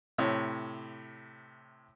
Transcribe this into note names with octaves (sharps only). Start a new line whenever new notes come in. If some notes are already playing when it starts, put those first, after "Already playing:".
A2 C3 C#5